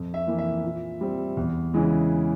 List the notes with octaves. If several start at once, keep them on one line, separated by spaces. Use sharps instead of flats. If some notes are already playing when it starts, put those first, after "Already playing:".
Already playing: F2
E5
E3 A#3
E5
A#2
G3 C4
E2
C#3 E3 G#3